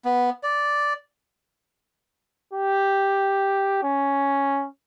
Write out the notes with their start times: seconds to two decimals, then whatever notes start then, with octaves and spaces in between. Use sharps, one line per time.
0.05 B3
0.43 D5
2.53 G4
3.84 C#4